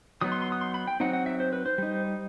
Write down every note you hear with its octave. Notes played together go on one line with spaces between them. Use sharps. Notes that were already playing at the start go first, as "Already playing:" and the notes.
F#3 B3 D#4 D#6
C6
C6
D#6
C6
B5
G5
F#3 C4 D#4 F#5
F#5
E5
C5
B4
C5
G3 D#4